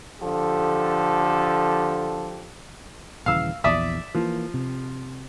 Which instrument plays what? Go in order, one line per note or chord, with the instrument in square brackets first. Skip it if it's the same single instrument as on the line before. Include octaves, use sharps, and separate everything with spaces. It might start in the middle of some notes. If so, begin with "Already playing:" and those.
[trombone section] D3 F3 G4 A4
[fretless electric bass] D#1 C#3 E3 [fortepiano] F5 E6
[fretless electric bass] A#1 E2 [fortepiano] D5 E5 D#6
[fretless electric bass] E3 A#3 [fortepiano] F3
[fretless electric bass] C3